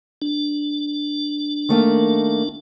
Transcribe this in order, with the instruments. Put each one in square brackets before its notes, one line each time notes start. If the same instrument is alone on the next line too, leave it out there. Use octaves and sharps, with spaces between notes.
[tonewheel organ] D4
[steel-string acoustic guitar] D#3 A3 A#3